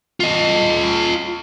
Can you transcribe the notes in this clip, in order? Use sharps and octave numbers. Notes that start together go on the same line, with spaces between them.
F4 D#5